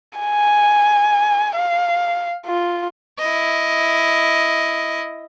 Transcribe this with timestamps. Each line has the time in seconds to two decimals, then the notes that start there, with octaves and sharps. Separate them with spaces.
0.19 G#5
1.56 F5
2.46 F4
3.19 E4 D#5